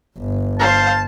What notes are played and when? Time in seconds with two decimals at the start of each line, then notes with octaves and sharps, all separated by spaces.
0.18 G1
0.59 C5 F5 A5